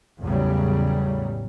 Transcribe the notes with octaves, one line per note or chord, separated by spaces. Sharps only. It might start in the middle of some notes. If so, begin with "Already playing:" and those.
A1 E2 A2 C#3 F#3 G3